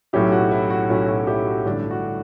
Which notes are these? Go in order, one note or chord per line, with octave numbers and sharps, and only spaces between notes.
B1 A2 F#3 C#4 E4 G4
F#4
E4
F#4
B1 A2 F#3 C#4 E4
F#4
E4 G4
F#4
A1 G2 D3 A3 D4 E4
F#4